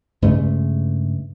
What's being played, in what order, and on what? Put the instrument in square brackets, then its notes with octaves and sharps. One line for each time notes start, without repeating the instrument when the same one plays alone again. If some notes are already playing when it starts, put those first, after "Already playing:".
[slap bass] G2 C#3 G#3 A3